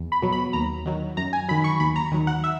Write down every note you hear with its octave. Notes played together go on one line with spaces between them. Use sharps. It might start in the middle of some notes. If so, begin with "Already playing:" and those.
Already playing: E2
B5
B2 F#3
B5
D#2 A#5
D#3 F#3
F#2 A#5
G#5
D#3 F#3 B5
C#6
D#2 B5
A#5
D#3 F#3
F#5
E5